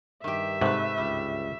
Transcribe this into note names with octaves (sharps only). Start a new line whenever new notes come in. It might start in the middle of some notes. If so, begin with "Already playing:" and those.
G2 D#3 G4 E5
G#2 C3 A3 B4
C#2 G2 G3